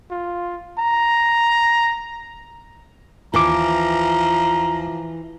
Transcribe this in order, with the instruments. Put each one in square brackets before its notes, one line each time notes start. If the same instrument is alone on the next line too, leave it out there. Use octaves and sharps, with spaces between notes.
[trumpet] F4
A#5
[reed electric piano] D#2 D6 [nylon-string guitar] E3 [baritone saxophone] F3 [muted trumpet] A#5